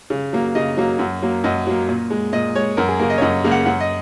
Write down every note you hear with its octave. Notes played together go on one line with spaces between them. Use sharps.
C#3
F#3 A#3
C#3 D#5
F#3 A#3
F#2
F#3 A#3
F#2 D#5
F#3 A#3
A#2
G#3
A#2 D#5
G#3 C#5
F#2 A#4
G#4
C#3 A#3 A#4
D#5
C#5
F#2 D#5
C#3 A#3
F#5
F#2 F#5
D#5